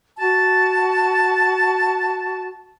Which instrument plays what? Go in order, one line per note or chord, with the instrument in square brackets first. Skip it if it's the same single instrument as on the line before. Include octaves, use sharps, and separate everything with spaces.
[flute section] F#4 A5